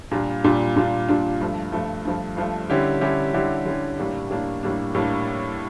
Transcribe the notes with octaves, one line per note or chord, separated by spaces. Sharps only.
A#2 G3 D4 F4
A#2 G3 D4 F4
A#2 G3 D4 F4
A#2 G3 D4 F4
G2 F3 A3
G2 F3 A3
G2 F3 A3
G2 F3 A3
D3 G3 C#4 E4 G4
D3 G3 C#4 E4 G4
D3 G3 C#4 E4 G4
D3 G3 C#4 E4 G4
A2 G3 A#3 D4
A2 G3 A#3 D4
A2 G3 A#3 D4
A2 G3 A#3 D4